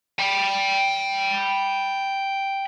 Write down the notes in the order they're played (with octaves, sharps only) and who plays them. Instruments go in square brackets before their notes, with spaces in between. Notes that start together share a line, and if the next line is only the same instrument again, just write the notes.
[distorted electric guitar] G5 B5